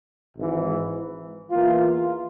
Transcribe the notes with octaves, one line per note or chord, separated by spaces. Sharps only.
G#1 G#2 E3
E2 E3 A#3 F4